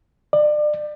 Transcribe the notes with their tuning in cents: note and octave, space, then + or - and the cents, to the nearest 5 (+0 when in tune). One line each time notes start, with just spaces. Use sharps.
D5 +30